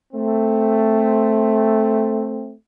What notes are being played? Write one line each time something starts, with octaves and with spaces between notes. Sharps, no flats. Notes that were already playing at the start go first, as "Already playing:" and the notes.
A3 C4